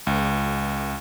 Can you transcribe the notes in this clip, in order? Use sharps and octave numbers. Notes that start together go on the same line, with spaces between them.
C#2